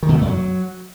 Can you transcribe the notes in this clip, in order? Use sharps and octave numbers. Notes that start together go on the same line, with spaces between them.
D#3
B2
A3
F#2
F#3